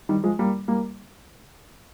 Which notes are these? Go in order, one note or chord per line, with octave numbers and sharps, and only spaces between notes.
D#3 G3
F3 G#3
G3 A#3
G3 A#3